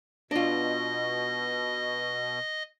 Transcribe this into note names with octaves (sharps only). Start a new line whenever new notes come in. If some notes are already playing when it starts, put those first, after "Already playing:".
B2 D4 F4 D#5